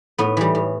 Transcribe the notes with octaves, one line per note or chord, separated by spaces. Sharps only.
A2 B3
E3 G3
A2